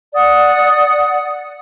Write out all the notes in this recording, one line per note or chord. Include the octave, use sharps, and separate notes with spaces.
D5 F#5 D#6